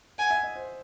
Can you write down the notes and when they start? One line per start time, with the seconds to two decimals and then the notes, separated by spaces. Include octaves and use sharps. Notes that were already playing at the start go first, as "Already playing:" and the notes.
0.18 F#5 G#5
0.31 E5
0.43 D#5
0.56 C5